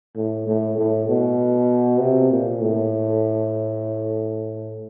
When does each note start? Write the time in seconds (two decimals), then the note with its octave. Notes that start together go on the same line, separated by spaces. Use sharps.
0.17 A2
0.47 A2
0.78 A2
1.08 B2
2.00 C3
2.31 A#2
2.62 A2